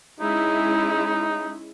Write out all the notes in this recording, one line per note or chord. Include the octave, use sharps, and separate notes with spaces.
G#3 C#4 D#4 E4